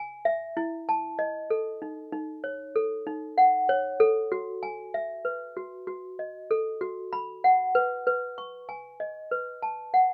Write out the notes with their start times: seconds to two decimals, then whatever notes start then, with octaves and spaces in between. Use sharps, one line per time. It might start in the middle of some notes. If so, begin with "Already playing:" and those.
Already playing: G#5
0.25 E5
0.57 E4
0.89 A5
1.19 D#5
1.50 A4
1.82 D#4
2.12 D#4
2.44 C#5
2.76 A4
3.07 D#4
3.38 F#5
3.69 C#5
4.00 A4
4.32 F#4
4.63 G#5
4.94 E5
5.25 B4
5.57 F#4
5.87 F#4
6.19 D#5
6.51 A4
6.81 F#4
7.13 B5
7.44 F#5
7.75 B4
8.07 B4
8.38 C#6
8.69 G#5
9.00 D#5
9.31 B4
9.62 A5
9.94 F#5